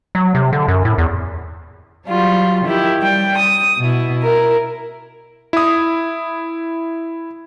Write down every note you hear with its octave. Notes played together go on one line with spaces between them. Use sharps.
F#3
C3
D3
F#2
A2
E2
F#3 G3 F4
D#3 E4 G4
G3 G5
D#6
B2 E4
E4 A#4
E4 D#6